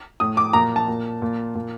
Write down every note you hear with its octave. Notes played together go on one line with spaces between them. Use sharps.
A2 D#6
D6
A#2 A#5
A5
A#2
A#2
A#2